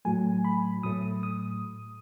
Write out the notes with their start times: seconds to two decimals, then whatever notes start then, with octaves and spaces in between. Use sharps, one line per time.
0.05 A2 F#3 A3 G#5
0.45 B5
0.83 A2 F#3 A3 D#6
1.23 D#6